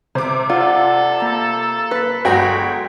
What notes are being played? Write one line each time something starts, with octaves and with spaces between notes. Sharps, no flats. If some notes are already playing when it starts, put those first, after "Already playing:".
C3 C5 D6
F4 A4 D5 F#5
A#3 A#5
B4 F#6 B6
G1 F#3 G#3 F#4 G5 C#6 A#6 B6